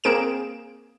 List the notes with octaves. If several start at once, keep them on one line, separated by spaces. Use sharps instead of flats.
A#3 C4 G#4 D7 E7